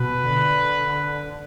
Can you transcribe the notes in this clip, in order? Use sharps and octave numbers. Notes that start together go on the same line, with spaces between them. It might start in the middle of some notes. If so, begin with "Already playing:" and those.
Already playing: B2 B4
D3